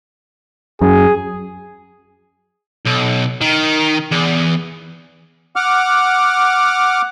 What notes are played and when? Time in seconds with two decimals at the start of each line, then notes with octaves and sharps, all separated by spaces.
0.82 F#2 G#4
2.85 B1
3.41 D#3
4.11 E2
5.56 F#5 D6 F6